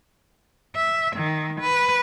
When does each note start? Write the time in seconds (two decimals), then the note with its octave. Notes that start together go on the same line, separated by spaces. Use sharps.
0.76 E5
1.17 D#3
1.61 B4